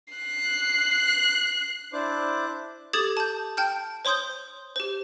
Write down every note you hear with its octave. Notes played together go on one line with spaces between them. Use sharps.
F#6 C7
D4 E4 C5 D6 F#6
G4 A4 D6 D#6 G#6 A6
A5 G6
G5 A5 F6 G6
C5 C#5 C6 D#6 G6
G4 C5